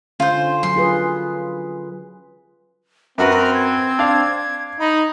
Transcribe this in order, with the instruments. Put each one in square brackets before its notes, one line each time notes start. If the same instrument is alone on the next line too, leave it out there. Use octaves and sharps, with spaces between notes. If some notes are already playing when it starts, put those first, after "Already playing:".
[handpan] D3 C#4 [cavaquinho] F4 C5
[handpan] F#3 [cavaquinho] C6
[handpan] F4 G#4 B4
[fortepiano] F#2 F#4 B4 [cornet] C4 [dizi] A#4
[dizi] G#6
[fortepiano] D4 F5
[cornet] D#4 [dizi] B5